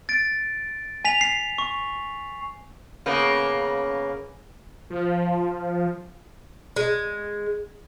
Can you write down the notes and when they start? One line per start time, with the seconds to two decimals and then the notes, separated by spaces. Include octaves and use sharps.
0.09 A6 D7
1.05 G#5 B6 F7
1.21 C7
1.58 C#6
3.06 C#3 A#3 B3
4.90 F3
6.76 G#3